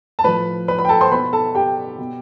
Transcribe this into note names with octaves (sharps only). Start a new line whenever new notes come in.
A5
A2 F3 B4 B5
B4 B5
B4 B5
G5
A4 A5
C5 C6
B2 B4 B5
A4 A5
G4 G5
B2